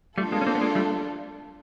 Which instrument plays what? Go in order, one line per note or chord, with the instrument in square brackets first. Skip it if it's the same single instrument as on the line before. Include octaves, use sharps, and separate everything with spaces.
[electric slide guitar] G3 A3 [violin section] D4 F4 A4
[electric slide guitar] G#3 A#3
C#4
A#3 C4
B3
G#3 A#3
G3 A3